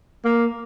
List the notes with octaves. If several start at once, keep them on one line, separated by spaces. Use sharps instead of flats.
A#3